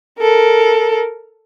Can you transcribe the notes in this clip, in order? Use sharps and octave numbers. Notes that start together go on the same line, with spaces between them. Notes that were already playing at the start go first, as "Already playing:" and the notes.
A4 A#4